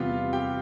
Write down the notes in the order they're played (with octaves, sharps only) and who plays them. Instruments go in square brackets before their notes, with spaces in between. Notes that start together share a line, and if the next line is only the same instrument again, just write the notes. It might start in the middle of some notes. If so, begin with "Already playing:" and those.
Already playing: [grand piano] E2 C3 G3 B3 F4 F5
G4 G5